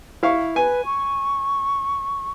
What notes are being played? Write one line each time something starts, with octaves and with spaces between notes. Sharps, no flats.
E4 F5 C#6
B4 G#5
C#6